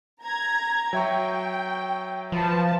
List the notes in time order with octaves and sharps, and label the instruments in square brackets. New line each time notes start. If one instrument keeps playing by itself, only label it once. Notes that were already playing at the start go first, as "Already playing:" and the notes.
[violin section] A#5 G#6
[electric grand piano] F#3 E5 C#6 [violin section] G5
[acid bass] F3 [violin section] B4 A5